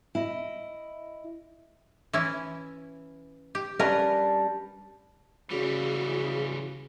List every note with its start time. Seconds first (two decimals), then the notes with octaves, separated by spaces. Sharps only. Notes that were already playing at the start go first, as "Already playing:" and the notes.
0.15 E4 D#5
2.13 E3 C#4 E4
3.55 G4
3.79 G3 C#4 D4 A#4 B4
5.51 C#3 E3 G3 E4 F#4 G#4